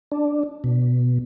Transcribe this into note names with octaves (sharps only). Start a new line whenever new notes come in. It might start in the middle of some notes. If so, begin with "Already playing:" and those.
D4
B2